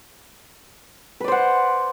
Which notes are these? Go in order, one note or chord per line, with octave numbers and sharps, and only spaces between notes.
B4 C5 D5 F#5